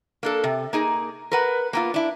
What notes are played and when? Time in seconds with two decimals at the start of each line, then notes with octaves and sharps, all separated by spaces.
0.23 A#3 D4 A4
0.44 C3
0.73 A#3 D#4 G#4
1.32 A#4 B4 F#5
1.73 A#3 B3 F4
1.94 D4 E4